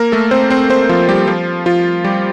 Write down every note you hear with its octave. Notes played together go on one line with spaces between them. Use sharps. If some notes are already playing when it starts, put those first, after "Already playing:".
Already playing: A#3 A#4
A3 A4
C4 C5
C4 C5
C4 C5
F3 F4
G3 G4
F3 F4
F3 F4
G3 G4